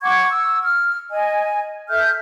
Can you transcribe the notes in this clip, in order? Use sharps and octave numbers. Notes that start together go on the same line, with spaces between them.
F#5 C#6 D6 G#6
E6
F6
D#5 G#5
A4 E5 F6 G6